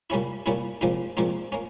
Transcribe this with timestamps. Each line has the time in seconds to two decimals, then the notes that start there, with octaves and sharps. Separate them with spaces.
0.10 A#2 G3 A#3 C#4 E4
0.46 A#2 G3 A#3 C#4 E4
0.81 A#2 F3 G#3 C4 D#4
1.17 A#2 F3 G#3 C4 D#4
1.52 A#3 C#4